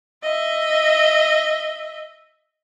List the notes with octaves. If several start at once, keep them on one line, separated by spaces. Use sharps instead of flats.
D#5 E5